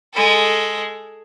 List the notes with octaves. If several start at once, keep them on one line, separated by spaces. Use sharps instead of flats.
G#3 A4